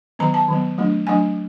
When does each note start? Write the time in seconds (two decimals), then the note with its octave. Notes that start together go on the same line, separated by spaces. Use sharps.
0.19 D#3 F#3 B3 A#5
0.34 A5
0.48 D#3 F#3 B3
0.78 F#3 A3 D4
1.07 F#3 A3 D4 G#5